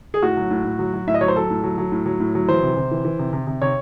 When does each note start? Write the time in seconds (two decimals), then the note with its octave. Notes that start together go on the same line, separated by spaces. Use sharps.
0.14 G#4
0.23 A2 F#4
0.37 F#3
0.50 A2
0.64 A2
0.79 F#3
0.94 F#3
1.07 A2 E5
1.14 D#5
1.21 F#3 C#5
1.28 C5
1.36 F#3 A4
1.50 A2
1.64 F#3
1.78 F#3
1.92 A2
2.06 F#3
2.20 A2
2.35 F#3
2.49 E3 C5
2.63 C3
2.77 C3
2.91 E3
3.05 E3
3.19 C3
3.33 C3
3.47 C3
3.62 C3 C#5